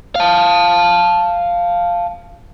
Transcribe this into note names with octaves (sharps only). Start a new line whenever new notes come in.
F5 A5